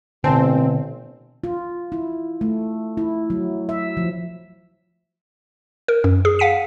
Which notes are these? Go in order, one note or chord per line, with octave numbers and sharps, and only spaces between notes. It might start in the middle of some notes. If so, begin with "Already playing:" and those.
A1 B2 D3 C4 G#5 A5
F4
E4
A3
E4
F#3
E5
F3
A#4
F#2
G#4
F5 F#5 B6 D#7